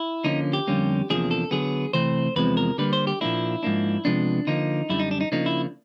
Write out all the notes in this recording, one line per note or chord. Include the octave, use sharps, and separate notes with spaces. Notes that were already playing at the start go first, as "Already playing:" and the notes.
Already playing: E4
D3 F3 A#3 C#4 D#4
G4
F2 D3 G3 A#3 C#4
E2 C3 F3 A#3 D4 G#4
A4
D3 F#3 B3 G#4
C3 E3 A3 C4 C5
E2 C3 F3 G#3 C4 B4
A#4
D3 G3 A#3 B4
C5
G4
A#2 F3 A#3 D4 E4
G#2 F3 A#3 D4
C3 F3 G#3 B3 D4
D3 F3 A#3 D#4
F#2 D3 G3 E4
D#4
D4
D#4
C#3 F3 A#3 D4 D#4
E4